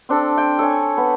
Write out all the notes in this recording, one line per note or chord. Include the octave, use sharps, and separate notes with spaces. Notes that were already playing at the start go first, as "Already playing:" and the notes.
C4 D4 A4
G5
A4 C#5 G#5
B3